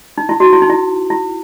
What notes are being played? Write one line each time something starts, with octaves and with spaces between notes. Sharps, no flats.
D#4
E4
F#4
E4
D#4
E4
E4